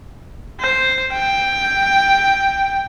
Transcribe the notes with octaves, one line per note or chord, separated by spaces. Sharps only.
C5
G5